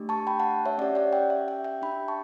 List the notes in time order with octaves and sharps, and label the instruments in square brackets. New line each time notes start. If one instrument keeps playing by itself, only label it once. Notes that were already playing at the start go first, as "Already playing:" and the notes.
Already playing: [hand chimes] A3 D4 G4
A5 C#6
G5 B5
F#5 A5
C#5 E5
C#4 G4 D5 F#5
D5 F#5
E5 G5
E5 G5
E5 G5
E5 G5
D4 G4 G5 B5
A5 C#6